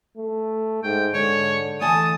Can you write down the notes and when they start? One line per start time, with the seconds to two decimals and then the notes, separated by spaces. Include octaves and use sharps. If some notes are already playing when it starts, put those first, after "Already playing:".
0.17 A3
0.83 G#2 G5
1.14 G#2 D3 C#5
1.81 E3 A3 G#5 A5 D#6